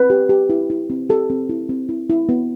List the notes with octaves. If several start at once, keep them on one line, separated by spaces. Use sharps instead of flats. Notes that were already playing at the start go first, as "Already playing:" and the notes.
Already playing: C4 B4
G4
G4
E4
E4
C4
G4 A4
C4
E4
C4
E4
E4
B3